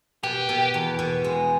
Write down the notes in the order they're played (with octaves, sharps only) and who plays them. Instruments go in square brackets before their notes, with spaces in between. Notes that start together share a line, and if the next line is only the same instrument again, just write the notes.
[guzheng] B2 [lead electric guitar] G4
[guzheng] B2
E2
B2
G#3